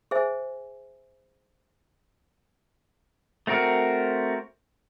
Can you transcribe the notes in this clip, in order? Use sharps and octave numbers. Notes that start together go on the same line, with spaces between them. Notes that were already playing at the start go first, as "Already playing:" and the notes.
G#4 C5 E5 G#5
A3 C4 F#4 A#4